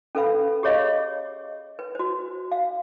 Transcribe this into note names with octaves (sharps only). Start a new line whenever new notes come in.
C#4 A4 B4 F5 B5
G4 G#4 C#5 D#5 F5
B4
F#4 C5
F5